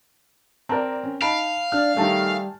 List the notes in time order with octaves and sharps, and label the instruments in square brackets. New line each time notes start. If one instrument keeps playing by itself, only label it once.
[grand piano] C4 A#4 [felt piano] D5 A5 A#5
[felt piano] C#4
[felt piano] D#4 [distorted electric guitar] F5 [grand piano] A5 B5 D7
[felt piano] D4 [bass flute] D5 [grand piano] F6
[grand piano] D#3 A3 [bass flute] G3 [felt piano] G#5 A5